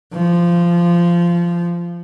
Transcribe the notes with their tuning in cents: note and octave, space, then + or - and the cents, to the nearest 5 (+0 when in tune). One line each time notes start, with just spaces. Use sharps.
F3 -15